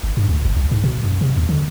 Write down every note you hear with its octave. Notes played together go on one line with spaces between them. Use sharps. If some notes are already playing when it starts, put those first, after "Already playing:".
G1
G2
D2
G1
C2
G#2
B2
F#2
C3
D#2
D3